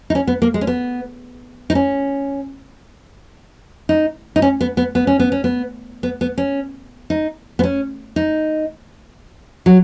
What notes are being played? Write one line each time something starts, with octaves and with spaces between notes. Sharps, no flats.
D#4
C#4
B3
A#3
G#3
C#4
B3
D#4
C#4
D#4
D#4
C#4
B3
B3
B3
C#4
B3
C#4
B3
B3
B3
C#4
D#4
B3
C#4
D#4
F#3